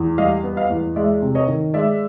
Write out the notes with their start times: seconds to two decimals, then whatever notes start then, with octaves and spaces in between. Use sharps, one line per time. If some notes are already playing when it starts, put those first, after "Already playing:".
Already playing: E2
0.18 G3 D#5 F5
0.44 B3
0.57 D#5 F5
0.70 E2
0.96 G#3 D5 E5
1.22 C3
1.35 C#5 D#5
1.48 D#3
1.74 G#3 D5 E5